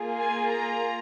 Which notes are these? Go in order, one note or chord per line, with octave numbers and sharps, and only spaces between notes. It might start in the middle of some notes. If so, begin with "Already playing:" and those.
Already playing: A#3 F4 G#4
G#5
A#5